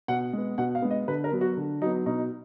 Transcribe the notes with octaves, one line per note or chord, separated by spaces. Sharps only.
B2 F#5
G#3 B3
B2 F#5
F5
G#3 B3
D#5
D3 B4
A#4
F#3 B3
F#4
D3
F#3 B3 D#4
B2 D#4